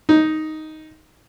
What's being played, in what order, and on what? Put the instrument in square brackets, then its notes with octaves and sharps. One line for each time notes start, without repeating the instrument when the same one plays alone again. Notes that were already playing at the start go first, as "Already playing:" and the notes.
[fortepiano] D#4